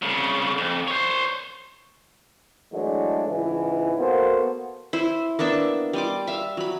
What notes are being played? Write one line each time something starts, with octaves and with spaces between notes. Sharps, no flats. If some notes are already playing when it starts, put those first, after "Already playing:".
C2 C#3
F2
C5 C#5
E3 F#3 G#3 A3 D4
C#2 G#2 E3
A#3 B3 F#4 A4 C5
E4 C5
A#3 B3 D4 E5
G3 D#5 C6 D6
E5 F5
F#3 B5